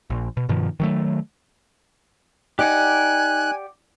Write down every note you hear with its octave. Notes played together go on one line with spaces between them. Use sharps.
A#1
B2
G2 B2 D#3 F3
D#3 F#3 A3
D#4 G4 D5 F#5 G#5 F#6